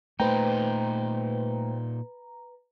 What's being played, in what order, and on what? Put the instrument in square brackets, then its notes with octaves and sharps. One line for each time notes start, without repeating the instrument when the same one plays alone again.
[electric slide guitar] A#2 D#4 [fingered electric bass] A3 [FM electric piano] B4 A#5 [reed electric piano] C5 G5